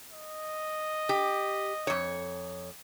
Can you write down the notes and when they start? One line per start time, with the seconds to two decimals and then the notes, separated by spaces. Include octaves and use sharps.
0.12 D#5
1.09 G4
1.87 F2 C#5